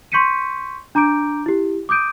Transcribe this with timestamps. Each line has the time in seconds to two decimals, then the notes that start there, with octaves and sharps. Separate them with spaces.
0.12 C6 C#6 G6 B6 C#7 D#7
0.95 D4 A#5 D6 G6 D7
1.46 E4 G4
1.89 D6 D#6 G6 D7 D#7